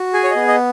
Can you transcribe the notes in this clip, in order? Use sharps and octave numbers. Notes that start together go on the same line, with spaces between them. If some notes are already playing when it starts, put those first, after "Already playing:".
Already playing: F#4
G#4 G#5
C#5
D#5
B3
D#5